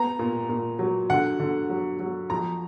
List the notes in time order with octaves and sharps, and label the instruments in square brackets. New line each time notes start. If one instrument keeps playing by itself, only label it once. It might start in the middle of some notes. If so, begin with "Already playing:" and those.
Already playing: [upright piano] B3 A#5
A#2
A#2
F#3
D3 F#5
D3
F#3
F#3
F2 A#5